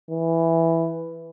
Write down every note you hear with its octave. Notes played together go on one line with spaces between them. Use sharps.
E3